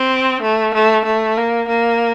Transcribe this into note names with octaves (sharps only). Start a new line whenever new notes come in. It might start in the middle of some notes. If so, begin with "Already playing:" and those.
Already playing: C4
A3
A3
A3
A#3
A#3